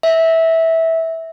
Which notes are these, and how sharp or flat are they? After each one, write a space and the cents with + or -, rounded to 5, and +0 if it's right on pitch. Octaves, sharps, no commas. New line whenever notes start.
E5 -15